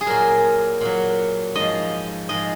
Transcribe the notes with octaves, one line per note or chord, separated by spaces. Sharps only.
G#4
A#2 F#3 A#4
A#2 F#3
G#2 F3 D#5
G#2 F3 D#5